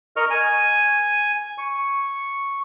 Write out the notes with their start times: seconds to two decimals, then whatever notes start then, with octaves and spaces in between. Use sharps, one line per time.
0.16 A#4 D#5 C#6 F6
0.30 G#5
1.58 C#6